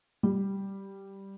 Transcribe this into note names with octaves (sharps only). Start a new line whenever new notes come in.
G3